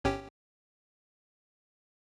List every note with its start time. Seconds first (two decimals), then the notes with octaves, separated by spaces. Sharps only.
0.04 G1 C#4 G4